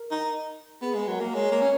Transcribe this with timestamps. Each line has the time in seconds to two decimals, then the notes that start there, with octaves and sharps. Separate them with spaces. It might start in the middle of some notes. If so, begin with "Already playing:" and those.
Already playing: A#4
0.11 D#4
0.82 B3 G#4
0.94 G#3
1.08 F#3 A#4
1.21 A#3
1.34 G#3 C#5
1.52 A#3
1.62 C#4